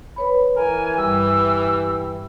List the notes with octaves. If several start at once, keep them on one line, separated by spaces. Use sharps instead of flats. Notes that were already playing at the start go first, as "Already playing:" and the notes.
B4 C#5 B5
E3 A#4 G#5
G2 G3 G4 E6